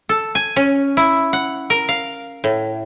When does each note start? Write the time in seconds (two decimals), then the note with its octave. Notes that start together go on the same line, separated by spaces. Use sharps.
0.09 A4
0.35 G#5
0.56 C#4
0.97 E4
1.33 F#5
1.70 A#4
1.89 F5
2.44 A2